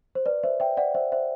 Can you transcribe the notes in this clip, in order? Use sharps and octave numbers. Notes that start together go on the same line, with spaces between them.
C5
B4 D5
C5 E5
E5 G5
D5 F#5
C5 E5
C5 E5